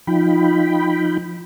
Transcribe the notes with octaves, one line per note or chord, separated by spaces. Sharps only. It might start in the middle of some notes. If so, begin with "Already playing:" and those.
F3 D#4 F4 G5 B5